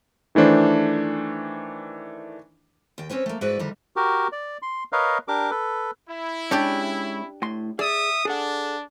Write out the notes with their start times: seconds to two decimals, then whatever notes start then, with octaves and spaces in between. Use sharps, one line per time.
0.35 D#3 E3 A3 D4 C5
2.98 D#2 G5
3.09 C4 C#4 B4 C#5
3.26 A3 A#3
3.41 G#2 E4 F#4 B4 D5
3.59 D2 D#3 G3
3.96 F#4 G4 A#4
4.32 D5
4.62 C6
4.92 A#4 B4 C#5 D#5 F5
5.28 D4 G4 A#4 D6
5.51 A4 B4
6.08 E4
6.51 G#3 C#4 D4 G4 D5
7.42 A2 C6
7.79 G#4 D5 E5 D#6
8.25 D4 G#4 A4 F#5